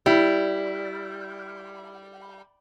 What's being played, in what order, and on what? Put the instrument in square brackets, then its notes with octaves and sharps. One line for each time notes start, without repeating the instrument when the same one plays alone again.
[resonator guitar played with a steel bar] G3 [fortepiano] E4